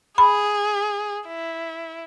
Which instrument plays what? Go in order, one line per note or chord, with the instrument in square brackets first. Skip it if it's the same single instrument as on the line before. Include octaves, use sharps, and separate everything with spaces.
[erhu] G#4 [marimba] B5
[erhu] E4